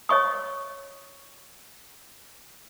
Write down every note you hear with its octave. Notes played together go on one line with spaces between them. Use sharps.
C#5 D#5 C#6 D#6